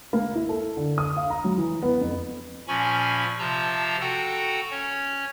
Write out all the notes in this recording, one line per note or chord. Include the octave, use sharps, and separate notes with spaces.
A#3
E4
A4
D3
D#6
F5
A#5
F#3
E3
B3
F2
A#2 F3 C#4 G#5 B5 C#6
C3 F3 F4 A5 A#5 E6
F#4 A4 F#5 G5 A#5
C#4 C#5